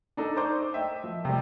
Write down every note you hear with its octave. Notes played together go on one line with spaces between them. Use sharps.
D4 D#4 A4
C5 A#5 C#6 D6 G6
D#5 E5 G5
F3
C3 G3